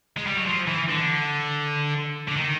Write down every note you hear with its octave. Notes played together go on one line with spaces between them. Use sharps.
G#3
G3
F#3
F3
E3
D3
D3
D#3